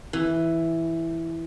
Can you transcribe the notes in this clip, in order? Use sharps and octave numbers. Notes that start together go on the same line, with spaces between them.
E3